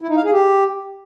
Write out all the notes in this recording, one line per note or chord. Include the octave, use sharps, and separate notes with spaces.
E4
D#4
F5
G#4
G4